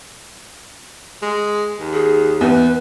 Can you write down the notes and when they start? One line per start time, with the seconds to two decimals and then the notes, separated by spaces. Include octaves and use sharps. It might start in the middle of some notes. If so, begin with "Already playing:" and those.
1.22 G#3
1.79 D#2
1.93 G#4
2.41 E2 B4